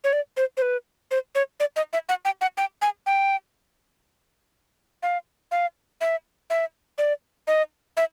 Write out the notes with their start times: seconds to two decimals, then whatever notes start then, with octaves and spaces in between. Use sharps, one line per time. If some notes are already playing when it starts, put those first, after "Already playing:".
0.04 C#5
0.13 D5
0.37 C5
0.57 C5
0.62 B4
1.11 C5
1.35 C#5
1.60 D5
1.76 D#5
1.93 E5
2.09 F#5
2.25 G5
2.41 F#5
2.57 G5
2.82 G#5
3.06 G5
5.03 F5
5.51 F5
6.01 E5
6.50 E5
6.98 D5
7.47 D#5
7.97 E5